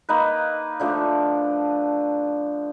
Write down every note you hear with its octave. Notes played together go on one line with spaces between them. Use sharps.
A#3 D#4 B4
D3 F3 A3 D4